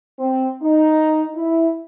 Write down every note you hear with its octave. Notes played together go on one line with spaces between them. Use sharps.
C4
D#4
E4